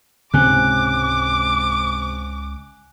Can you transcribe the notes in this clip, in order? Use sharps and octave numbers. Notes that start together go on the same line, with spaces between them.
C#2 G#2 C3 G#3 C#4 G#5 D6 F#6